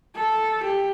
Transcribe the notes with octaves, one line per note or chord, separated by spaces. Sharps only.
A4
G4